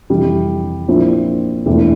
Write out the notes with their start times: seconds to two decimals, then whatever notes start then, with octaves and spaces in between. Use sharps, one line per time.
0.10 F2 C3 E3 G3
0.88 A#1 A#2 F3 C4 E4
1.66 E1 E2 E3 A3